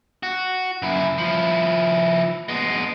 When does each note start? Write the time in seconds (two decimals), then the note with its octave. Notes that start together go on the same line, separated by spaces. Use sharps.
0.23 F#4
0.82 F#2 E4
1.18 F3 E4
2.48 G#3 B3